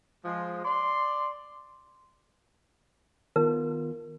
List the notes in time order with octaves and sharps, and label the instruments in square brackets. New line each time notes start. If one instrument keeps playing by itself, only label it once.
[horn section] F3 G#3
D5 C6
[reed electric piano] D#3 B3 F4 [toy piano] A#4